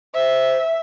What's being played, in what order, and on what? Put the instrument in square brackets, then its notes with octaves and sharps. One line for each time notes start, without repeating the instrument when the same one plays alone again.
[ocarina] C5 [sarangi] E5